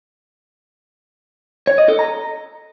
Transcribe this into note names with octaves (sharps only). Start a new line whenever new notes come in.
C#5
D#5
A4
A#5